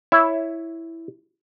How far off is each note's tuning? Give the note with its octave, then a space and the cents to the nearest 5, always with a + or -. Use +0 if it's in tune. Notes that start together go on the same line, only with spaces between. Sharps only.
E4 +0 C#5 +0 E5 +15